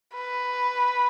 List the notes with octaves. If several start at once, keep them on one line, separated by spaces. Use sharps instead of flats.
B4